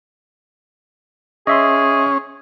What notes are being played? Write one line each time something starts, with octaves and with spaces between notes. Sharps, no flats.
C#4 G#4 D#5 E5 C6